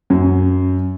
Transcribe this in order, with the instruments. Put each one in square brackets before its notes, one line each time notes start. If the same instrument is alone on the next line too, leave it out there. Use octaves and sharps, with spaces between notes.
[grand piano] F#2